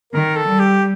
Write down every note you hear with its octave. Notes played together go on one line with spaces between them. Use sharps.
D#3 A#4
A4
G3
G4